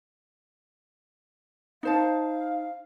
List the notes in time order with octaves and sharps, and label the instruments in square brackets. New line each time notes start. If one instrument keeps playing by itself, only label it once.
[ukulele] D#4 C5 A5 [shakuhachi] F5